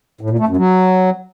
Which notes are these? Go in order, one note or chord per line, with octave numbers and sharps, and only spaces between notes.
A2
A#2
A3
F#2
F#3